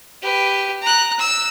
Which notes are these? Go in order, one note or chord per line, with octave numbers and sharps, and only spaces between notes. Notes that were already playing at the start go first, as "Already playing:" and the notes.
G4 B4
A#5 F#6
E6